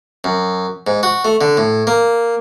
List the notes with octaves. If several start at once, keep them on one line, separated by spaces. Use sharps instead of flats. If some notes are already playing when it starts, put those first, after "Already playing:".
F#2
G#2
F#4
A3
D3
A2
A#3